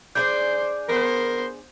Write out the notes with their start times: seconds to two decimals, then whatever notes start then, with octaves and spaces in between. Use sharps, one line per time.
0.15 D4 G#4 C5 D5 G6
0.88 B3 A#4 C5